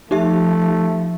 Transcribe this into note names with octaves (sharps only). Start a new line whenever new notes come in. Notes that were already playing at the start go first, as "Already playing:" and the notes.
F3 A3 D#4 G4 E5